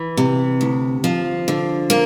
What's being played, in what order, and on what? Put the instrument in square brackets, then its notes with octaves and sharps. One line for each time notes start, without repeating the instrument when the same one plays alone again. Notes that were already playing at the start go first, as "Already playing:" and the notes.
Already playing: [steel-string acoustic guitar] E3
C3
D2
F3
D3
A#3